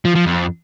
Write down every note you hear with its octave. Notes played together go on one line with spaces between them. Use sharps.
F3
F3
F2